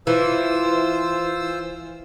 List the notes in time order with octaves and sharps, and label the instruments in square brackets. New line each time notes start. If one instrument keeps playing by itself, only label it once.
[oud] E3 [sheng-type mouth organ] F4 C5 E6